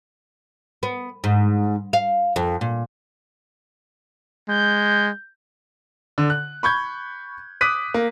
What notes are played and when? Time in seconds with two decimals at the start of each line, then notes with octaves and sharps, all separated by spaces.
0.83 B3
1.24 G#2
1.93 F5
2.36 F2
2.61 A#2
4.49 G#3 G6
6.18 D3
6.30 F#6
6.63 B5 C#6 G6 G#6
7.61 D6 D#6 F#6 B6 D#7
7.94 A#3